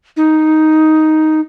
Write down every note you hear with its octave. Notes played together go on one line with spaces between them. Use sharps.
D#4